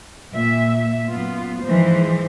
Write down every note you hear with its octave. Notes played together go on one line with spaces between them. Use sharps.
A#2 E5
F#2 B3 F4
G#2 E3 F3 G#3 C5